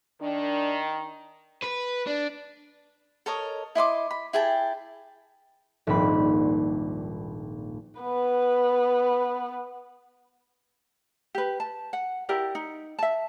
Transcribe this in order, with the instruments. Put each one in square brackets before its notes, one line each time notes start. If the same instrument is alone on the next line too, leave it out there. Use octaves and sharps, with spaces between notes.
[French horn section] D#3 [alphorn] D4
[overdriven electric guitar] B4
D4
[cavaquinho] A4 A#4 C#5 D#5
E4 D#5 C6 D6
B5
E4 G#4 G5 A5
[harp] D#1 A#1 G#2 G3 C4 B5
[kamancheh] B3 B4
[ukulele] G4 B4
A5
F#5
E4 G4 A#4 D5
D#4
E5 A5